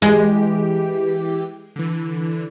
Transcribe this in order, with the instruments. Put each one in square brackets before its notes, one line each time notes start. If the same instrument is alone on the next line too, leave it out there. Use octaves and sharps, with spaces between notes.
[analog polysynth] E3 G4 [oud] G#3
[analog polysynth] D3 E3